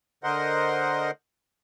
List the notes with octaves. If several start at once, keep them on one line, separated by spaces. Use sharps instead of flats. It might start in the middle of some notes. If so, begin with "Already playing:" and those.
D3 A#4 C5 D#5 F#5 C6